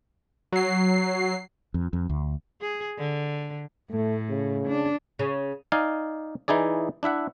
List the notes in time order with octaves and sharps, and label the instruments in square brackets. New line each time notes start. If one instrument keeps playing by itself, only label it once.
[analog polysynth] F#3 C7
[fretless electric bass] F2
F2
D2
[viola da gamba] G#4
D3
[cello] A2 [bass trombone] A3
[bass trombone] C#3
[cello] D4
[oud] C#3
[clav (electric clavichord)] D#4 D5 F5 G#5
E3 D#4 E4 G#4 D5
D4 E4 E5 F#5